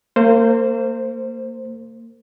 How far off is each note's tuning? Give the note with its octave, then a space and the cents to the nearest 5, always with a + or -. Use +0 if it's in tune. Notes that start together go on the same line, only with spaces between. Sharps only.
A#3 -30 C5 +0